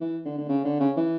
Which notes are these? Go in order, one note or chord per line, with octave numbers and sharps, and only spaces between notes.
E3
D3
D3
C#3
D3
C#3
E3